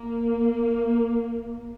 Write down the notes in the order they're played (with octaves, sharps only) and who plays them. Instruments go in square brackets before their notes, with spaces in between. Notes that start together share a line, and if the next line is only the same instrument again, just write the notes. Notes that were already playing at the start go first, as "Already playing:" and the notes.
Already playing: [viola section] A#3